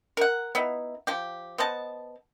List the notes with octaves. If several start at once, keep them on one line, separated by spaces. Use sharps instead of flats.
A#4 F#5
B3 D#4 E4
F3 G4
B3 C5 D#5 A5